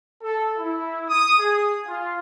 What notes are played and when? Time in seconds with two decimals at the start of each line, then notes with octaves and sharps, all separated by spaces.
0.22 A4
0.57 E4
1.09 D#6
1.38 G#4
1.86 F4